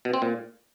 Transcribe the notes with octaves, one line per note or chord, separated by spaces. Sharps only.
B2
C4
A#2